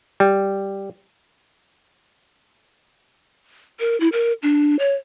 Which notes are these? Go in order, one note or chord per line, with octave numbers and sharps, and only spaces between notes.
G3
A#4
E4
A#4
D4
C#5